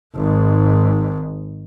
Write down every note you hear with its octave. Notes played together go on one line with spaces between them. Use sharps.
G#1 G#2